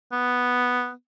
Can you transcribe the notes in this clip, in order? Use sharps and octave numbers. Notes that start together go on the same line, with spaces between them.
B3